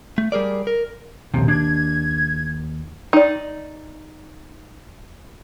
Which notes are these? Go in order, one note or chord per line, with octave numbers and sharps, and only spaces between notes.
A3
G3 G#4 A#4 D5
A#4
A#1 D#2 C3
D4 G#6
D#4 D5